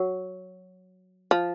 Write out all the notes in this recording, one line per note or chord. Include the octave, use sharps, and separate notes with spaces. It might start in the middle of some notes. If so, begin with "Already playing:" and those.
Already playing: F#3
F3